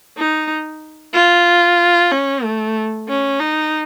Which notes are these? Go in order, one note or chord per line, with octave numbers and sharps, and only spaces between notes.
D#4
F4
C#4
A3
C#4
D#4